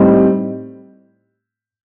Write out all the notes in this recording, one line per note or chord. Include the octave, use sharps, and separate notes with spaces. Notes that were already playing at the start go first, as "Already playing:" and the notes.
Already playing: A2 G3 C4 D#4